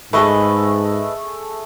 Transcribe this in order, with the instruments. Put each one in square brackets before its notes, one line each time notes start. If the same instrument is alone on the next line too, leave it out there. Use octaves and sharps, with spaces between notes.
[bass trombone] G#2 [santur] A3 G#4 [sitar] B4 D#5